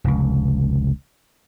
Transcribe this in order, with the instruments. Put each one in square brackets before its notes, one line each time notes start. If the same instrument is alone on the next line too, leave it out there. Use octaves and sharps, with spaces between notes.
[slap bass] F1 C#2